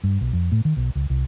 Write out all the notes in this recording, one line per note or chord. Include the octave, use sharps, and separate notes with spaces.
G2
B1
F2
A2
D#3
B1
C#2
C2